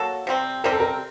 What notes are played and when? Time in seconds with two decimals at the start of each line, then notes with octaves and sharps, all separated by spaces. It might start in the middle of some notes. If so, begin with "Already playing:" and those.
Already playing: F#3 A#3 F#4 A4
0.27 C3 G3 C4
0.64 C3 G3 C4 A#4
0.72 A4
0.80 A#4